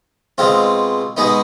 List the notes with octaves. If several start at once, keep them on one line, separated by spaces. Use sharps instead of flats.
B2 G#3 C4 F4
B2 G#3 B3 D#4